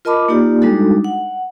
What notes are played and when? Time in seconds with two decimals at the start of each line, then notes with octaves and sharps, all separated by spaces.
0.05 F4 A#4 D#5 A5 B5 D6
0.28 A#3 D#4 F4 G4 D5
0.62 G3 G#3 D4 D#4 F#4 A4
1.04 F#5